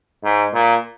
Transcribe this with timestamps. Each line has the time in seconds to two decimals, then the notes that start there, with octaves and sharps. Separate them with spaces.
0.24 G#2
0.54 A#2